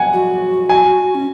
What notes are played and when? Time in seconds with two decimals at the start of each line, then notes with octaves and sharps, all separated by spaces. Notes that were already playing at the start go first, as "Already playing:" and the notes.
Already playing: F#5 G#5
0.13 F#4
0.69 G#5
1.15 C#4